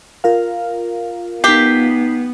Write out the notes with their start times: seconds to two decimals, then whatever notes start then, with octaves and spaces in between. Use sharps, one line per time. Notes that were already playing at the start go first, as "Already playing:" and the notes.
0.24 F4 A#4 F5
1.44 B3 D#4 G4 B6 C7